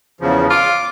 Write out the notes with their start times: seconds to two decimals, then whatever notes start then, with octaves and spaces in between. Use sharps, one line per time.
0.21 E2 C#3 F3
0.51 F4 D6